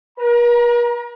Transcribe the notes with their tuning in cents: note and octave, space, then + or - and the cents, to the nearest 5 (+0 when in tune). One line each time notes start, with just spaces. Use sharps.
A#4 +45 A#5 +25